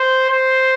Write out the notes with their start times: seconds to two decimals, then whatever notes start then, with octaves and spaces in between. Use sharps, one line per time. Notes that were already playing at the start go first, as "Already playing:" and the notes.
Already playing: C5
0.30 C5